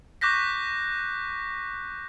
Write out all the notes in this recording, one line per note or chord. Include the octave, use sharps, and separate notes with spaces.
C#6 D6 F#6 G6 A#6 B6